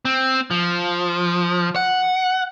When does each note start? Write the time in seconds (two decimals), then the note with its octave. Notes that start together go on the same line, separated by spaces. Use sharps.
0.05 C4
0.51 F3
1.76 F#5